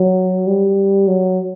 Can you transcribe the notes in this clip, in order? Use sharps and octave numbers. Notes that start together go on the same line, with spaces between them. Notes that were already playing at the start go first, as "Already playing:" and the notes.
Already playing: F#3
G3
F#3